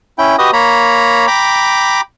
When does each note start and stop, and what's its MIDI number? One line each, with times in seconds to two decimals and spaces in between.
0.18 0.36 61
0.18 0.36 64
0.18 0.36 79
0.39 0.51 66
0.39 0.51 67
0.39 0.51 71
0.39 0.51 75
0.39 0.51 87
0.53 1.27 58
0.53 1.27 73
0.53 1.27 82
0.53 1.27 83
1.27 2.01 79
1.27 2.01 82
1.27 2.01 83
1.27 2.01 86